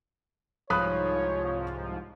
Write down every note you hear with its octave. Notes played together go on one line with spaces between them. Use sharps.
C2 G#2 F3 C#5 B5 D#6 F#6